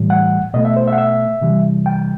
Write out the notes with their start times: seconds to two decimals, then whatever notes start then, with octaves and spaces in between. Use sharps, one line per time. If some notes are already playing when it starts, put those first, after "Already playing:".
Already playing: A2 E3 G3
0.10 F#5
0.54 B2 A3 D#5
0.65 E5
0.76 C5
0.87 E5
0.93 F#5
0.98 E5
1.41 C3 E3 G3
1.86 G5